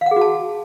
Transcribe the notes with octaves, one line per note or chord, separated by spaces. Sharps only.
F5
F#5
G#4
F#4
A5